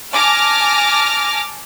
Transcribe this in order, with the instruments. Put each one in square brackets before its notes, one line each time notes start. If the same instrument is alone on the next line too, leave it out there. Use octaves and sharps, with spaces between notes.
[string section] G#5 A5 D6 F6 A#6